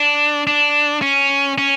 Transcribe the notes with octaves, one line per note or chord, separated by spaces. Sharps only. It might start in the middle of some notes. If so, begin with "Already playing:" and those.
Already playing: D4
D4
C#4
C#4